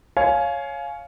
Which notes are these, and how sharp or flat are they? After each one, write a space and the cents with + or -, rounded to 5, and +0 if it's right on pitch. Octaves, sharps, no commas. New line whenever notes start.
C#5 +0 F5 +0 G#5 +25